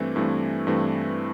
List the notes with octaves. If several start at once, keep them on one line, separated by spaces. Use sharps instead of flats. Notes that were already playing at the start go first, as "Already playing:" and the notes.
Already playing: G2 E3 A3 C4
G2 E3 A3 C4
G2 E3 A3 C4